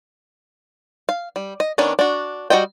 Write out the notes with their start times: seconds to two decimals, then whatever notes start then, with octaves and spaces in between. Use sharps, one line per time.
1.09 F5
1.36 G3
1.60 D#5
1.78 D#3 B3 C#4 D4
1.99 D4 F#4
2.50 G3 F#4 C5 D#5 G5